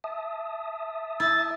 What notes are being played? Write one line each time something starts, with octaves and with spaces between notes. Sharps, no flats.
E5 A5 D#6
E4 A6